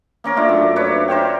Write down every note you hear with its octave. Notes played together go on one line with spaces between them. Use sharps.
A#3 C#4 A#4
A3 D4 F4
F#2
D4 B4 C#5
A#4 C5 F5 G5